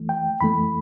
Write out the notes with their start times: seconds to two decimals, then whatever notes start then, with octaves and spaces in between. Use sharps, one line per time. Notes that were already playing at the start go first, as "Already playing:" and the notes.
Already playing: F2 E3 A3
0.09 G5
0.41 F2 E3 A3 B5